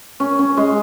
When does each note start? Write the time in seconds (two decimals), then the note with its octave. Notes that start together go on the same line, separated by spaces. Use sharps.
0.20 C#4
0.39 C#4
0.57 G#3